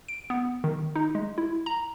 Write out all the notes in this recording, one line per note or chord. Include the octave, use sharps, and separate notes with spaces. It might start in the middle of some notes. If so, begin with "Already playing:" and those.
D7
B3
D#3
D#4
G#3
E4
A#5